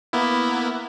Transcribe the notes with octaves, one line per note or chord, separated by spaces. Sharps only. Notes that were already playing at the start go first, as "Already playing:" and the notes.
A#3 B3 E4